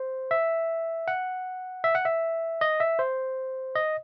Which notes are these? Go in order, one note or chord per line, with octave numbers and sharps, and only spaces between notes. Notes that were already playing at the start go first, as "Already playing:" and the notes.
Already playing: C5
E5
F#5
E5
F#5
E5
D#5
E5
C5
D#5